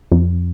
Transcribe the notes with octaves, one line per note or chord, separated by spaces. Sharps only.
F2